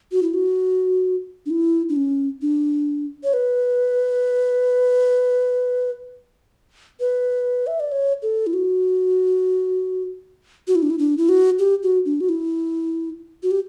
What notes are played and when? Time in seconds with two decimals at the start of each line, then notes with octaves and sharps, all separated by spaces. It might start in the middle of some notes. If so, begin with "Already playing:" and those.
0.12 F#4
0.23 E4
0.34 F#4
1.46 D4
1.50 E4
1.89 D4
1.96 C#4
2.42 D4
3.24 C#5
3.33 B4
7.00 B4
7.67 E5
7.80 D5
7.92 C#5
8.23 A4
8.47 E4
8.53 F#4
10.68 F#4
10.75 E4
10.83 D4
10.90 E4
10.99 D4
11.18 E4
11.29 F#4
11.59 G4
11.83 F#4
12.05 D4
12.21 F#4
12.29 E4
13.43 F#4
13.51 G4